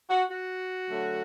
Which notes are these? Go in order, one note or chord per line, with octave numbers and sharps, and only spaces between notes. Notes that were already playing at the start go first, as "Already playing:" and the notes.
F#4
F#4
D3 F#3 A3